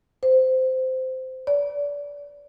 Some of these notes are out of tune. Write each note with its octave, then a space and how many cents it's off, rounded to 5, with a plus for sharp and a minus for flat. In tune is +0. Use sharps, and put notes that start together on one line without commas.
C5 -15
D5 -30